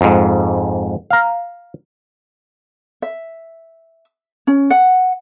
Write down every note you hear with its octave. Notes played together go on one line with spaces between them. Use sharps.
F2 G#2
F5 A#5
E5
C#4
F#5